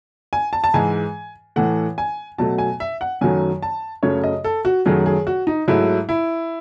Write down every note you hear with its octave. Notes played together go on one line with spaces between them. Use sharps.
G#5
A5
A5
G#2 E3 G#3 G#5
A2 E3 A3 F#5
G#5
B2 F#3 A3 A5
G#5
E5
F#5
F#2 D#3 F#3 A3 G#5
A5
F#2 C#3 F#3 A3 C#5
D#5
A4
F#4
F#2 D#3 F#3 A3 G#4
G#4
F#4
D#4
G#2 F#3 A3 E4
E4